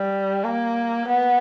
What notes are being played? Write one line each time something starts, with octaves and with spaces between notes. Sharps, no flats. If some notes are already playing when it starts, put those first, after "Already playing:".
Already playing: G3
A#3
B3